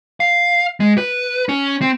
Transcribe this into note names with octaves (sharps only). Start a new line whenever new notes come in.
F5
G#3
B4
C#4
C4